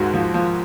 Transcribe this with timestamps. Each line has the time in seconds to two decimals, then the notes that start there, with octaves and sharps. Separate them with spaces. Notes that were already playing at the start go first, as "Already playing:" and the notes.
Already playing: D#2 G#2 F#4
0.14 F3
0.34 F3